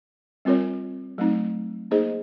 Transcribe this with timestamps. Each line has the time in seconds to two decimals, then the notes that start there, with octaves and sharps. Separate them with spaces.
0.45 G3 C4 F4 A#4 C#5
1.18 F#3 A3 C4 D#4
1.91 A#3 D#4 G#4 C5 D#5